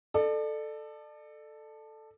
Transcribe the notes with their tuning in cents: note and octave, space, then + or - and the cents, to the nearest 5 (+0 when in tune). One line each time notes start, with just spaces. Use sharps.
A4 +0 D5 +35